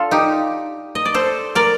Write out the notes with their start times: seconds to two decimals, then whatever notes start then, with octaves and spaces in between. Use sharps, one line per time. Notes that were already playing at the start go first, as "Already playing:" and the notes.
Already playing: D4 F4 A4
0.11 D#4 G4
0.95 D#5
1.05 D5
1.14 A4 C5
1.55 A#4 D5